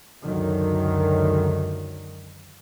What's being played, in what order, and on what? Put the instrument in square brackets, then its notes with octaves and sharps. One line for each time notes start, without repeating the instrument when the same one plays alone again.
[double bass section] C#2 F#2 D3 D#3 F#3